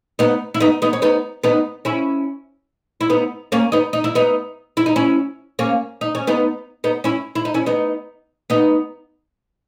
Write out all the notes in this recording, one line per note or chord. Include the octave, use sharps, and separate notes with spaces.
B3 D#4
E4
B3 D#4
B3 D#4
C#4
B3 D#4
B3 D#4
C#4 E4
E4
B3 D#4
A#3 C#4
B3 D#4
D#4
E4
B3 D#4
E4
D#4
C#4 E4
A#3 C#4
D#4
C#4
B3 D#4
B3 D#4
C#4 E4
E4
D#4
C#4 E4
B3 D#4
B3 D#4